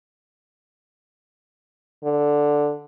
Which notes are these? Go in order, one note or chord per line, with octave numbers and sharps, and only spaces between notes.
D3